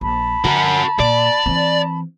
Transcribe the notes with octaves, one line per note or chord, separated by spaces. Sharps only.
A#1 A5 B5
D3 F#4 A#4
A#2 D5
E3 C4